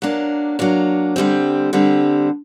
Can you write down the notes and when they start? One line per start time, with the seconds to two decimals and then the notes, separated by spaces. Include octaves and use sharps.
0.02 F#3 A#3 D4
0.59 F#3 A#3 D4
1.16 D3 G3 C4
1.73 D3 G3 C4